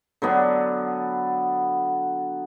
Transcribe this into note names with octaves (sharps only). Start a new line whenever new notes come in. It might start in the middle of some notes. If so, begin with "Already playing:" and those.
D3 F#3 B3 D4